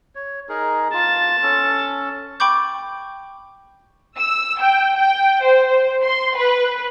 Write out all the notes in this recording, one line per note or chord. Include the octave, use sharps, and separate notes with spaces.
C#5
D#4 G#4 A#4
F4 A5
C#4 A4
G5 B5 C#6 D6 G6
E6
G5
G5
C5
C6
B4